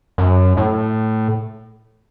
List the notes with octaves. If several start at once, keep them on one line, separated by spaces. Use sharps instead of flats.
F#2
A2